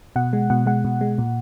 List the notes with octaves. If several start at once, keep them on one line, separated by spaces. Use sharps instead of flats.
B2 F#5
G#3
B2 F#5
G#3 F#5
B2
G#3
A#2